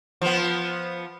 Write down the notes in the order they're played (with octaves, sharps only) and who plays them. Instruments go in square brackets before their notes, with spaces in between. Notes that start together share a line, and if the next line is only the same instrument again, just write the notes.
[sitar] F3 B3